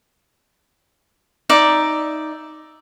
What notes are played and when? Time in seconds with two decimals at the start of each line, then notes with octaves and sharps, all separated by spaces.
1.49 D#4 D5 E5